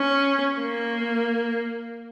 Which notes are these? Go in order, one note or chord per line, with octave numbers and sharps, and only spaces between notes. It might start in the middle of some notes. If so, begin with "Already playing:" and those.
Already playing: C#4
A#3